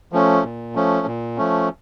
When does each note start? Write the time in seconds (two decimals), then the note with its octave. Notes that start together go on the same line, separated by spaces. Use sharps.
0.12 F3 A3 C#4
0.44 A#2
0.75 F3 A3 C#4
1.07 A#2
1.38 F3 A3 C#4